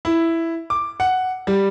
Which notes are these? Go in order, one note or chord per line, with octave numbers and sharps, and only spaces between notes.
E4
D6
F#5
G3